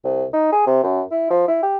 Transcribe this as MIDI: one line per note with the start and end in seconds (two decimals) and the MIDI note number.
0.04 0.25 36
0.33 0.48 63
0.52 0.66 68
0.67 0.81 48
0.83 1.01 42
1.11 1.26 64
1.30 1.46 53
1.48 1.61 64
1.63 1.78 67